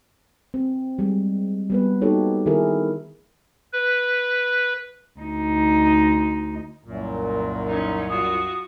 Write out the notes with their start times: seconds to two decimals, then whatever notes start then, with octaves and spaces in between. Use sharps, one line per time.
0.54 C4
0.99 G3 G#3
1.70 G3 B3 B4
2.02 A#3 D#4 F#4 G4 A4 C#5
2.46 D#3 E4 G#4 A#4
3.73 B4
5.20 D2 D#4
6.85 C2 F#2 A#2 F#3
7.67 C#4 D#4
8.10 F4 F#4 D#6